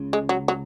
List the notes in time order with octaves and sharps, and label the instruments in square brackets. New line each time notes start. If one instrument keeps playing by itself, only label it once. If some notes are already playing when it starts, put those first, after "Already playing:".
Already playing: [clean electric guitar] C#2 C#3
[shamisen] G#3
F#3
F#3